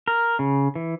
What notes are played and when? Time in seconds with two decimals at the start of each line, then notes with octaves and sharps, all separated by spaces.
0.08 A#4
0.39 C#3
0.76 E3